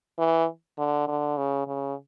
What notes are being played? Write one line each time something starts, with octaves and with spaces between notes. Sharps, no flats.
E3
D3
D3
C#3
C#3